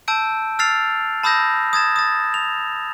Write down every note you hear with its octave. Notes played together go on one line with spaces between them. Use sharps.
A5 E6 G6 D7
E6 F6 A6 C7 F7
A5 B5 D#6 E6 G6 A#6
D#6 G#6 A6 E7
D#6 A6
F7